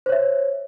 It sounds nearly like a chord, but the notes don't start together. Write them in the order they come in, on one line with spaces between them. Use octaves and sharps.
C5 C#5 E5